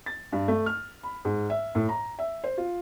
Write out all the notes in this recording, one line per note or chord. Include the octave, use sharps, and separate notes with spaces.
A6
G2
A3
F6
B5
G#2
E5
A2
A#5
E5
C5
F4